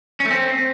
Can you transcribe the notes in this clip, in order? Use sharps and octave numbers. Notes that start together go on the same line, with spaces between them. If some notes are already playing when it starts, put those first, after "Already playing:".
C#4
A3
C4